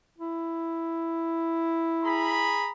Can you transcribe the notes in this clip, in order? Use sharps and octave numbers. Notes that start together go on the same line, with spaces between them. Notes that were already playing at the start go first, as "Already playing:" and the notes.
E4
G#4 A#5 B5